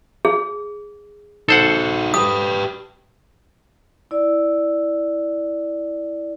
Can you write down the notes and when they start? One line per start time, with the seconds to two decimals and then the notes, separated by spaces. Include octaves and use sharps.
0.25 G#4
1.49 D#4 F#4 A4 C5 F#5
2.14 G4 B4 D#6
4.11 E4 D5